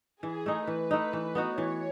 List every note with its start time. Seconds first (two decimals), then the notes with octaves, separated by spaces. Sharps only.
0.23 E3 G#4
0.46 A3 D#4
0.67 E3 B4
0.91 A3 D#4
1.13 E3
1.35 B3 D#4 F#4
1.57 E3 C#5